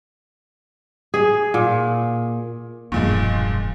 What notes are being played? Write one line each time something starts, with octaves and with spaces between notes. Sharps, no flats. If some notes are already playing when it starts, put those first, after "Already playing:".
G#4
A#2
E1 G2 A#2 F3 G#3